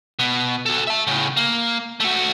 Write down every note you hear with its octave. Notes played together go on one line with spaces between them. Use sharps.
B2
F#4 A4
E5 A5
A2 C#3
A#3
A3 F#4